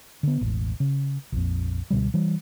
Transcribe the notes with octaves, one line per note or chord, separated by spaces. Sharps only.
D3 B3
E1 A1
C#3
A#1 F2
C#2 B2 D3 G3
E3 G3